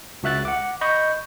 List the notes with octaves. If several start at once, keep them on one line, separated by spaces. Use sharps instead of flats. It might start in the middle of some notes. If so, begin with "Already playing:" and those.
C#2 F#4 E5 F#6 A6
F#5 D6
D#5 B5 C#6 G6